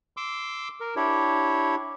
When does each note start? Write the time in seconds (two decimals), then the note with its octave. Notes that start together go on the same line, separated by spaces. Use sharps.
0.17 C6 D6 E6
0.80 A#4
0.96 D4 E4 G4 C#5